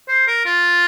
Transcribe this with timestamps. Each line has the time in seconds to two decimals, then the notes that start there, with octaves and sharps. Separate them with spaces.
0.08 C5
0.27 A#4
0.46 F4